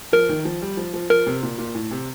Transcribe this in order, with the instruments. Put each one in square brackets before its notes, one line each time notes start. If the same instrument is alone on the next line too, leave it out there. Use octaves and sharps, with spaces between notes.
[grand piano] F3 [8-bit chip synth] A#4
[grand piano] D#3
F3
G3
F3
F3
[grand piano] F3 [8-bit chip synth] A#4
[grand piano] C3
A#2
A#2
A2
C3